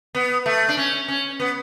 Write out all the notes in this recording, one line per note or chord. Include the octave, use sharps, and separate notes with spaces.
B3
A3
D4
C#4
C#4
B3